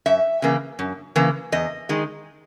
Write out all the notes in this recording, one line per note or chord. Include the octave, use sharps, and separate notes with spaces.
F#2 E5
C#3 E3 A#3
F#2
C#3 E3 A#3
E2 D#5
D#3 G#3